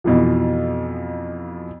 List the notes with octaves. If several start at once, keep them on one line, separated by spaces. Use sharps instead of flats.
F2 B2 E3 F3